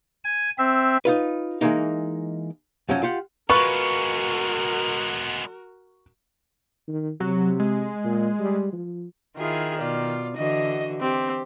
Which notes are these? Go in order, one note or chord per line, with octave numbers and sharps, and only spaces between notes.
G#5
C4 E5
D#4 F4 B4
E3 F3 G#3 A#3 D#4
F#2 F3 F#3 C#4
F4 G4 F#5
G#3 B3 F4 F#4 A#4 B4 C#6
D#3
C3 F#3
G#3
A#2
G3
F3
D#3 E4 F4 G#4
B2 F4 D5
D3 E3 F#4 D#5
C4 G4